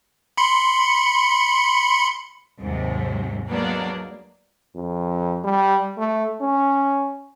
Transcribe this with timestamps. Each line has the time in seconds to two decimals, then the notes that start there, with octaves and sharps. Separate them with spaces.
0.37 B5 C6 C#7
2.60 D#2 G#2 C3 F#3
3.49 F#3 G#3 A#3 B3 D4
4.75 F2
5.44 G3
5.98 A3
6.41 C#4